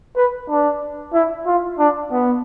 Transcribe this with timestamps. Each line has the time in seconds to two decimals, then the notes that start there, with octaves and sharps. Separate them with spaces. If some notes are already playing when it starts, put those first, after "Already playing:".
0.17 B4
0.49 D4
1.14 E4
1.46 F4
1.79 D4
2.12 B3